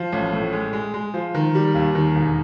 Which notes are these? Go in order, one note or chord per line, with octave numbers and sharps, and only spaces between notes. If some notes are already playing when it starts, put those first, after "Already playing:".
Already playing: F3
A1
A2
G#3
G#3
G#3
F3
D#3
G3
D#2
D#3
E1